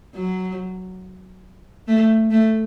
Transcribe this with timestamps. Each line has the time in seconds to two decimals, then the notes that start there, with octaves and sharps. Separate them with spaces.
0.15 F#3
1.88 A3
2.31 A3